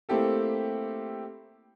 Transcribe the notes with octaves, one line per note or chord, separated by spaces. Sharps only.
A3 A#3 C4 E4 G4 A4